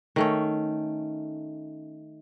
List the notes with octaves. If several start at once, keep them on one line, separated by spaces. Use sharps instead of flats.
D#3 A3 C#4